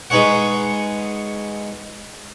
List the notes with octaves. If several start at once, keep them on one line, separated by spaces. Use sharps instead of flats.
G#3 B3 D#4 G#4 C#5 F#5